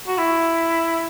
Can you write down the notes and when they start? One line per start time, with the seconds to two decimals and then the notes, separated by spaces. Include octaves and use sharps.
0.07 F#4
0.18 E4